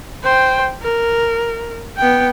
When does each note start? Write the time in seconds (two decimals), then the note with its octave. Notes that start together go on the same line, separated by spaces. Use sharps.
0.23 C5 G5
0.82 A#4
1.97 B3 G5